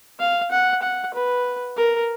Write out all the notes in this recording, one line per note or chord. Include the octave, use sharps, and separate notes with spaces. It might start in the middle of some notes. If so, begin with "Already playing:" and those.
F5
F#5
F#5
B4
A#4